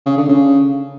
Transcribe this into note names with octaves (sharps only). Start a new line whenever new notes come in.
C#3
D3
C#3